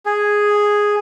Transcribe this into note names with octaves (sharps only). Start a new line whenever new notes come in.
G#4